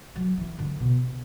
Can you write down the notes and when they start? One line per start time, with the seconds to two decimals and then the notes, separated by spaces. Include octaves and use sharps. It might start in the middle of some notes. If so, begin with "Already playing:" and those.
0.16 F#3
0.38 E3
0.59 D3
0.80 B2